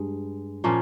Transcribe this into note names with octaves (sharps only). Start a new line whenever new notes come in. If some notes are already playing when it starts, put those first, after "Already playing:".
Already playing: G2 G#3
A#2 F3 A#3 C#4